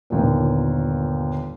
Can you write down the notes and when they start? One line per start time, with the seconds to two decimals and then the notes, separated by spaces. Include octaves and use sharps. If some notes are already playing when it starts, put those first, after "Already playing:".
0.10 G1 D#2 A#2